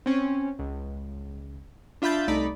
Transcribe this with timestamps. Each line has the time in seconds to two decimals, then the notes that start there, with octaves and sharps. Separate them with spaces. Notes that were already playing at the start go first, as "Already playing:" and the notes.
0.06 C4 C#4
0.59 C#2
2.02 D4 F4 E5 B5 G6 A6
2.28 C2 A3 D#4 D5 B5